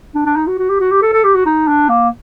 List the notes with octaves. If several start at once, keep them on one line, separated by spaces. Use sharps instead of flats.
D4
D4
D#4
F#4
F#4
G4
F#4
G4
A4
A4
G4
F#4
D#4
D4
A#3